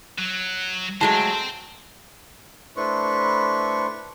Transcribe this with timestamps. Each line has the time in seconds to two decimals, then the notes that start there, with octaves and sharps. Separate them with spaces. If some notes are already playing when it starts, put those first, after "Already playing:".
0.18 F#3
1.01 F#3 G#3 A3 C5 G5 A5
2.77 A3 D4 E4 B4 C5 C#6